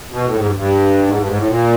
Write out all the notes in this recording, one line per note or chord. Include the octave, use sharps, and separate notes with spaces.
B2
A2
G#2
G2
G2
G#2
G2
G#2
A2
A#2